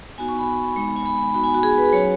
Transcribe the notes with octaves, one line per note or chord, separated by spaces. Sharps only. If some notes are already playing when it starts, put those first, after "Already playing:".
B3 D#4 F#4 G#5
C#6
B5
G#3 B3 D#4
G#5
B5
B3 D#4 F#4 B5
G#5
F#4
G#4
B4
F#3 C#4 F#4 C#5